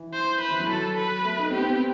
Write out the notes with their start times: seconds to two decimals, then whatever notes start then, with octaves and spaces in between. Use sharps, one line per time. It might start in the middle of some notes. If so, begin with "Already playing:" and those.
Already playing: E3
0.13 C5
0.41 B4
0.50 E3
0.60 F#3
0.70 A4
0.98 B4
1.25 A3
1.39 D#4
1.50 C4 G4
1.60 B3
1.70 C4